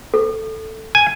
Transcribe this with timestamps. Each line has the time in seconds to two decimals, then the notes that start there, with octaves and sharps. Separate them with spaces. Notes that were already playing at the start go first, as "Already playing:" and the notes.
0.14 A4
0.95 G#5